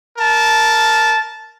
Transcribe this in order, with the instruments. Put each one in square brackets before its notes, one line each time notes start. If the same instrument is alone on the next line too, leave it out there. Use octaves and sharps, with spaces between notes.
[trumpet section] A#4 A5